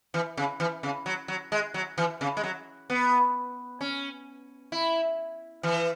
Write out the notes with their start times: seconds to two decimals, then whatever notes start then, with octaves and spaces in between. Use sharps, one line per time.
0.14 E3
0.37 C#3
0.60 E3
0.83 C#3
1.06 F#3
1.28 F#3
1.52 G#3
1.74 F#3
1.98 E3
2.21 C#3
2.37 G#3
2.44 F#3
2.90 B3
3.81 C#4
4.72 E4
5.63 E3